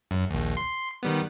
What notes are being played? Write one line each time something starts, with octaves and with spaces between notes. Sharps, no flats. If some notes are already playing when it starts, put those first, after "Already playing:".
F#2
A#1 D#2
C6
D#3 G3 B3